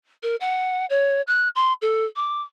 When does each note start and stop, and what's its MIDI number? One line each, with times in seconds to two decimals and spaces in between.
0.23 0.36 70
0.40 0.86 78
0.90 1.21 73
1.27 1.48 90
1.55 1.73 84
1.82 2.05 69
2.16 2.42 86